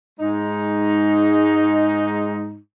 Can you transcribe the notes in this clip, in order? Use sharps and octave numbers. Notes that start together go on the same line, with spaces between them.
G#2 G#3 D#4